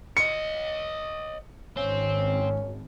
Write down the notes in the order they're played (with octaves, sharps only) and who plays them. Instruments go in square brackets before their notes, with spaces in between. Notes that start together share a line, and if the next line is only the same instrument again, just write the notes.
[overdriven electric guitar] C#5 D#5 [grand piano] C#7
[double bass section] G#1 [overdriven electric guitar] C4 [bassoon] C#4